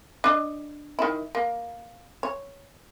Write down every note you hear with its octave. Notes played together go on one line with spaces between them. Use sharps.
D4 D#5
D#3 E4
A#3
C#5